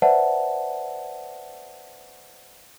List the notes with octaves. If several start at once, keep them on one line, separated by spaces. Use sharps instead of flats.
B4 C5 D5 E5 F#5 A5